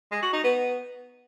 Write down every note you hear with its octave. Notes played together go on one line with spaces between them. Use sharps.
G#3
F#4
D#4
B3